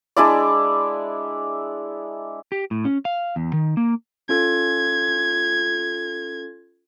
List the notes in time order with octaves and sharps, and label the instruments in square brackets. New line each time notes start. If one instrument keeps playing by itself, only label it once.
[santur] G#3 D4 E4 D5
[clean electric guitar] G4
A2
C#4
F5
E2
D#3
A#3
[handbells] C#4 F4 A4 [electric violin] G#6